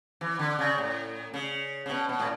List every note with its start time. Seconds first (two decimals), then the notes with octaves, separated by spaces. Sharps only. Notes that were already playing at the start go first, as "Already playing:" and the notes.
0.21 E3
0.39 D3
0.59 C#3
0.78 A2
1.34 C#3
1.86 C#3
1.90 B2
2.09 B2
2.19 A2